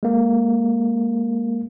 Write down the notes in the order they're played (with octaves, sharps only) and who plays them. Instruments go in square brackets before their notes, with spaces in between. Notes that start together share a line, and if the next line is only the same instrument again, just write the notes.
[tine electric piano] G#3 A#3